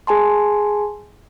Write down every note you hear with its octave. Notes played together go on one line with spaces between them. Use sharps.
G#4 G#5 A5 C6